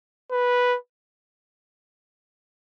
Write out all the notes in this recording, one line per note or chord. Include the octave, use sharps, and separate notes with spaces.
B4